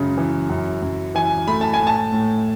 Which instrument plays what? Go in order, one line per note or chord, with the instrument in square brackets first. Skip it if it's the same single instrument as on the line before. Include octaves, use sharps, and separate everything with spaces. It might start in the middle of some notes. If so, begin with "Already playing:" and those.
Already playing: [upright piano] F#2 C#3 G#3
E3
F#2
F#2
E3 G#5
A3 B5
A5
G#5
A2
A5
A2